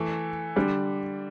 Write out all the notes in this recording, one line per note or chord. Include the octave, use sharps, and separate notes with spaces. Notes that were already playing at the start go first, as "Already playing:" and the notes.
Already playing: E3 A3
D3 G3